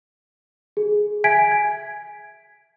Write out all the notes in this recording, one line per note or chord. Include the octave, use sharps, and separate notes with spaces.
G#4
E5 G#5 G#6 B6 D7
G#6